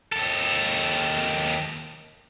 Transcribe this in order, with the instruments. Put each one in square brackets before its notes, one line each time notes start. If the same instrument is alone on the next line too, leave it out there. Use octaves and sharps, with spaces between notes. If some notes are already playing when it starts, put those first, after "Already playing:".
[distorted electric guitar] D#2 A4